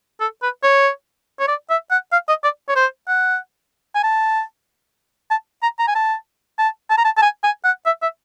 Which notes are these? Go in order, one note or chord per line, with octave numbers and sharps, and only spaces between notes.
A4
B4
C#5
C#5
D5
E5
F#5
F5
D#5
D5
C#5
C5
F#5
G#5
A5
A5
A#5
A#5
G#5
A5
A5
A5
A#5
A5
A5
G#5
G#5
F#5
E5
E5